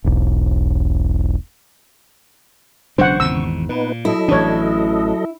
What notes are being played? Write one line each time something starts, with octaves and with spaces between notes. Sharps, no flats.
E1 B1
E1 C#3 F#3 D4 C5 F#5 C#6
G#1 E2 B2 E6
A#2 B3 D#4 B4
F#3 E4 A4 D#5
A1 E3 D4 C#5